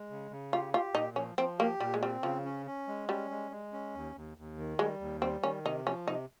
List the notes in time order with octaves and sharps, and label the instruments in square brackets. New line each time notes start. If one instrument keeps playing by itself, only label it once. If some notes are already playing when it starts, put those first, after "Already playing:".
Already playing: [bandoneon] G#3
C#3
C#3
[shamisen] F4 [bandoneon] G4
[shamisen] F4 [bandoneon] G4
[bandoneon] A#2 [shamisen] D#4
[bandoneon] F3 [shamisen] C#4
[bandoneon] F3 [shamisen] C4
[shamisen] A#3 [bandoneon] G4
[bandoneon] A#2 [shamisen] G3
[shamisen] G#3
[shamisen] G3 [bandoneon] C4
[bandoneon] C#3 [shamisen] F3
[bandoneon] C#4
C#4
G#3
[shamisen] G3 [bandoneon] C#4
[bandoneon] G#3
G#3
C#4
D#2
D#2
D#2
D#3
[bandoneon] G3 [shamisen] G#3
[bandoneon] D#2
[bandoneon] G3 [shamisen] C4
[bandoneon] D#3 [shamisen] C#4
[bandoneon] C3 [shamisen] D#4
[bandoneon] F3 [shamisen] C#4
[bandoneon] C3 [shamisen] D#4